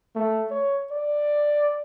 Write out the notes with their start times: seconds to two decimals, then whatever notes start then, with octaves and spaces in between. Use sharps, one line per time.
0.16 A3
0.51 C#5
0.92 D5